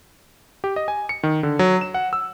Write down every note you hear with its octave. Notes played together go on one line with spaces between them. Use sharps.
G4
D#5
G#5
C#7
D#3
D3
F#3
E7
F#5
E6